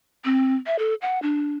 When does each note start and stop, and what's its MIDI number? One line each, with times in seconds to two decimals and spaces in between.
0.25 0.55 60
0.66 0.76 76
0.79 0.94 69
1.02 1.21 78
1.22 1.57 62